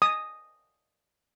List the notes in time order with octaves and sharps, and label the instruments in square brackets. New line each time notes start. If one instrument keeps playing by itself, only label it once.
[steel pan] D#6